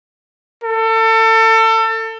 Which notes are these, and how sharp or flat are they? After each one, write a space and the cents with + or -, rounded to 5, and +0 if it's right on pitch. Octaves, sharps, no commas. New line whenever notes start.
A4 +30